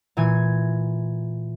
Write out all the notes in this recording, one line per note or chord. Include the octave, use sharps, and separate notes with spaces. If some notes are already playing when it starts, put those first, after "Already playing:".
A#2 E3 G#5 G#6